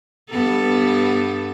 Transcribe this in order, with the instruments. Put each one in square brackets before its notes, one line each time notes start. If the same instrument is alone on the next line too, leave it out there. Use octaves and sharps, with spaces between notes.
[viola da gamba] G2 B3 A4